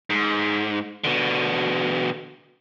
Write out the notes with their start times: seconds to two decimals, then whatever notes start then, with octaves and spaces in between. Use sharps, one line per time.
0.10 G#2
1.04 B2 D3